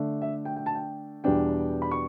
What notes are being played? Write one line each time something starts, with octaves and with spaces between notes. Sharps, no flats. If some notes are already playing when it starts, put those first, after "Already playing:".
Already playing: D3 A3 D4
E5
G5
G5
A5
G5
E2 B2 G3 B3 D4 G5
B5
C#6